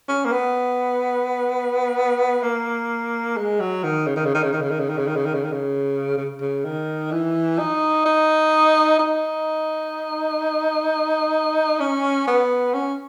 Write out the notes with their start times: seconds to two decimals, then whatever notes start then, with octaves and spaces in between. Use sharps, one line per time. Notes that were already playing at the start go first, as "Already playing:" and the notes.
0.09 C#4
0.25 A#3
0.32 B3
2.43 A#3
3.37 G#3
3.60 F#3
3.83 D#3
4.07 C#3
4.16 D#3
4.26 C#3
4.34 D#3
4.43 C#3
4.53 D#3
4.62 C#3
4.71 D#3
4.80 C#3
4.89 D#3
4.98 C#3
5.07 D#3
5.16 C#3
5.26 D#3
5.34 C#3
5.44 D#3
5.53 C#3
6.18 C#3
6.41 C#3
6.65 D#3
7.12 E3
7.59 D#4
8.06 D#4
8.99 D#4
11.80 C#4
12.27 B3
12.74 C#4